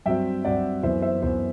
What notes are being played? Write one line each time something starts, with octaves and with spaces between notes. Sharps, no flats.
G2 F#3 C4 E5 G5
G2 F#3 C4 D5 F#5
F#2 E3 B3 C5 E5
C5 E5
F#2 E3 B3 C5